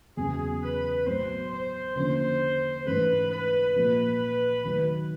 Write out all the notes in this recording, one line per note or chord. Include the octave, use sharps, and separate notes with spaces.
E2 C#3 F#3 B3 G#4
B4
A2 F#3 B3 C5
C5
D3 F3 A#3 C#4 C5
G#2 E3 A3 C#4 B4
B4
A#2 F3 G#3
D#3 F#3 A3